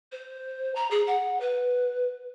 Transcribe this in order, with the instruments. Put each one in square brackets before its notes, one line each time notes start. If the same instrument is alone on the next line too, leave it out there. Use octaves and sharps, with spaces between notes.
[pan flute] C5
A#5
G#4
F#5
B4